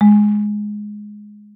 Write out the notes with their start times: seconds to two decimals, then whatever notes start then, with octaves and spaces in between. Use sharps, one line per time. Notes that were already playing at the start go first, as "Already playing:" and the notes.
0.01 G#3